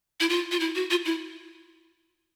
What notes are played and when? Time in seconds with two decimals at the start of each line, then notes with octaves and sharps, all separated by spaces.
0.20 E4
0.29 F4
0.52 F4
0.60 E4
0.75 F#4
0.90 F4
1.05 E4